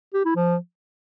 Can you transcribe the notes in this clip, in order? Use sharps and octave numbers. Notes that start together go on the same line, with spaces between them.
G4
E4
F3